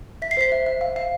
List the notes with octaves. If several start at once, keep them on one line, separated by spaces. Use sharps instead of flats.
E5 B6
C7
C5 B6
E5
E5
F5
F5